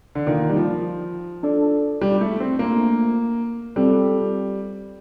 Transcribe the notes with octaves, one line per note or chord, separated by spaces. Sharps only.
D3
D#3 A#3 F4 A#4 D5 F5
G3
F3
D4 A4 D5
G3
A3
C4
A3 A#3 D4 F4
G3 C4 F4 A4